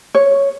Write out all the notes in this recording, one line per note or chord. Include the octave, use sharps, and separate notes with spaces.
C#5